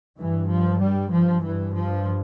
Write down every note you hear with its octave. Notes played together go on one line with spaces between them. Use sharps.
G2 E3
F3
G3
F3
G2 E3
F3